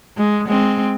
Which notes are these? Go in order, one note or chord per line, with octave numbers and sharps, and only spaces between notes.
G#3
G#3 C4